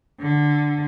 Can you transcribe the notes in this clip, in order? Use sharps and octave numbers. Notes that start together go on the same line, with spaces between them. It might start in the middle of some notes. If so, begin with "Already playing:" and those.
D3